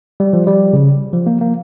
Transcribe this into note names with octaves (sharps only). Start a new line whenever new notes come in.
G3
F3
G3
C#3
F3
A#3
A#3